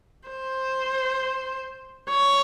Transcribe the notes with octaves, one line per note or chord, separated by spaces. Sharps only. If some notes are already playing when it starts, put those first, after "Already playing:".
C5
C#5